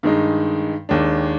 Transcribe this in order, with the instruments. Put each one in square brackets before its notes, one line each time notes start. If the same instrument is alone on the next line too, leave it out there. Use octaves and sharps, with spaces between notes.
[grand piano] G2 D#3 G#3 D#4
D#2 D#3 G#3 D4